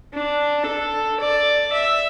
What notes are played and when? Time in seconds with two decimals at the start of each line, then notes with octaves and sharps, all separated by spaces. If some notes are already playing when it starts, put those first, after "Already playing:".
0.14 D4
0.66 A4
1.20 D5
1.73 E5